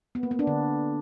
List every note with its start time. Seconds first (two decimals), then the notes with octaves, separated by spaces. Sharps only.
0.15 B3
0.23 A#3
0.31 B3
0.39 D4
0.47 D3